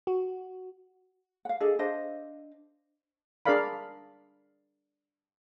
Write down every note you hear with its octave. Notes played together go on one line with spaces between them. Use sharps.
F#4
F5 F#5
D4 G#4 A4 D#5
D4 C5 D#5 F5
D4 G#4 A#4 D5 F5 B5